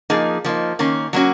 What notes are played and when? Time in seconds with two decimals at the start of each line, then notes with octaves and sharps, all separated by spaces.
0.10 F3 A#3 D#4 G#4
0.45 F3 A#3 D#4
0.79 D#3 A#3 C#4
1.13 F#3 A#3 C#4 F#4